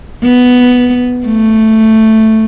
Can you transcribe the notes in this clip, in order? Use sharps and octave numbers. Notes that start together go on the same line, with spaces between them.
B3
A3